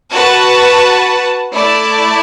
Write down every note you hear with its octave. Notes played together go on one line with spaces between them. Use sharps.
F#4 B4 F#5 A5
A3 E4 D5 A5